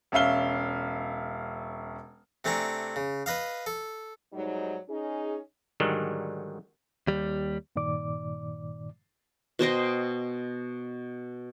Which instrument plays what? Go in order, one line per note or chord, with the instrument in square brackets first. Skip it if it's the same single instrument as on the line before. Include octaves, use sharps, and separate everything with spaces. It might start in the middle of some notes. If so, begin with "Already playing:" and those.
[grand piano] E1 C#4 E5 F5 G7
[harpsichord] C3 A3 D4 G#5 A#5 C#6
C#3
B4 D#5 F5
A4
[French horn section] G#2 F#3 G3 D#4
C#4 D#4 G#4
[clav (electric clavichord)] G#2 D3 D#3 F#3 G3
[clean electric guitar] D#2 G3
[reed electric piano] G2 A#2 D#3 D5 D6
[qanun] B2 C5 D#5 G5